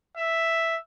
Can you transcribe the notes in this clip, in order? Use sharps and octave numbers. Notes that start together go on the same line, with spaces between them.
E5